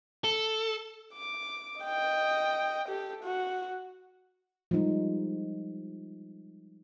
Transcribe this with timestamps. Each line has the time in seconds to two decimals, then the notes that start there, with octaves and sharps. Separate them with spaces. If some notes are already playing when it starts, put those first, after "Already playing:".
0.24 A4
1.13 D6
1.81 D#5 G5
2.89 G4 A4
3.24 F#4
4.71 F3 G3 G#3 D#4